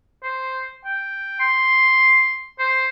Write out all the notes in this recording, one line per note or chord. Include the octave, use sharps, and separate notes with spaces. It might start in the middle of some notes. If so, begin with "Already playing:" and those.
C5
G5
C6
C5